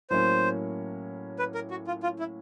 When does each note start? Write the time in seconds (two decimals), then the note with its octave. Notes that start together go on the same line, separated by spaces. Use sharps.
0.10 A2 F#3 A#3 C#4 C5
1.39 B4
1.55 A#4
1.71 F#4
1.87 F4
2.03 F4
2.19 E4